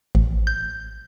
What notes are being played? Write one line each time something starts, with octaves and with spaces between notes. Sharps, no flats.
A1
G6